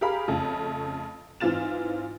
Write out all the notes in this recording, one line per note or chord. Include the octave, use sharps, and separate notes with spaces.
G4 G#4 A#4 F5 B5
F2 C#3 A3 C#4
G#2 E3 C4 F4 A6 E7